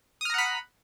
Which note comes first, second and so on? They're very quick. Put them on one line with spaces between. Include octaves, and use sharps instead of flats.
D#6 F6 A#5 F#5 B5